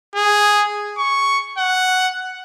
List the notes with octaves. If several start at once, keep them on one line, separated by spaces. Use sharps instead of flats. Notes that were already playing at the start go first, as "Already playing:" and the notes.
G#4
C#6
F#5